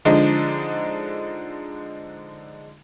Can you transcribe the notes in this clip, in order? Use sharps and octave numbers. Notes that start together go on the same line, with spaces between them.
D3 F3 G#3 D4 D#4